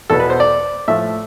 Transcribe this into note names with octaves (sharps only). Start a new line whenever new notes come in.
E2 B2 B3 A4
B4
C5
D5
A2 F3 A3 E5